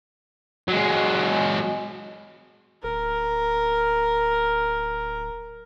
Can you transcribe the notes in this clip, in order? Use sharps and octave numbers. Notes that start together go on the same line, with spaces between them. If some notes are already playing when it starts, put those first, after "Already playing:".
F#3 G#3
D1 A#4